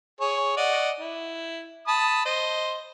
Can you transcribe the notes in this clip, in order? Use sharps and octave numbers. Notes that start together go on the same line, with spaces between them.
G#4 C#5
D5 D#5 F#5
E4
A5 B5 D#6
C5 D#5